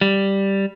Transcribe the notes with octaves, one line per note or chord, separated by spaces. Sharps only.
G3